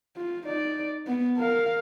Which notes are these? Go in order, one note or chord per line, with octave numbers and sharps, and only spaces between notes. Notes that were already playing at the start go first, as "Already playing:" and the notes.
F4
D#4 D5
B3
A#4 F5